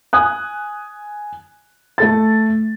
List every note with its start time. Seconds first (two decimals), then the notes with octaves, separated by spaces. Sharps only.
0.13 G#5 D#6 F#6
1.98 A3 A4 A6